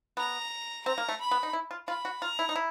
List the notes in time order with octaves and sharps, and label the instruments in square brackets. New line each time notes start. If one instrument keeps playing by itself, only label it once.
[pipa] B3 [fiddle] A#5
[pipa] C4 [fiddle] A#5
[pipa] A#3
A3
[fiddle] B5
[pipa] B3
D#4
E4
F4
[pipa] F4 [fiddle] B5
[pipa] F#4
[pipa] F4 [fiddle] A#5
[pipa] E4
D#4
E4